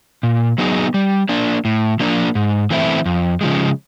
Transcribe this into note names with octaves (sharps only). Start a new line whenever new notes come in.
A#2
F#3 B3 D#4 G#4
G3
A#3 D4
A2
F3 A#3 D4
G#2
E3 A3 C4 E4
F2
C#3 F3 G#3